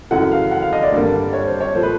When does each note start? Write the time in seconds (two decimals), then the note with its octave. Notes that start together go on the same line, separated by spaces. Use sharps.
0.11 F#2 C#3 E3 A3 F#5
0.32 F5
0.51 F#5
0.63 F5
0.73 D#5
0.83 D5
0.92 G2 D3 G3 A#3
1.33 C#5
1.46 C5
1.60 C#5
1.75 A#2 F3 A3 C5
1.83 B4